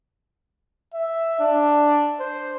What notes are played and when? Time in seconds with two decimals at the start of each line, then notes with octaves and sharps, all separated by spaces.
0.94 E5
1.40 D4
2.20 C5